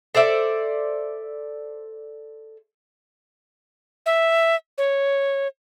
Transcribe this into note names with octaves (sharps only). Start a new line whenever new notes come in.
A4 C5 D5 E5
E5
C#5